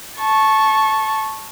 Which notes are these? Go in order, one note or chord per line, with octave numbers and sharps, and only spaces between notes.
A5 C#6